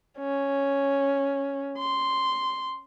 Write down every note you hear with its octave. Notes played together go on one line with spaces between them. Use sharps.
C#4
C6